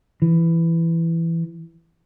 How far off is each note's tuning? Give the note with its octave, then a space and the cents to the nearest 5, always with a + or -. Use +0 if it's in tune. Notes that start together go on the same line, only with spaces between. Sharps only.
E3 +10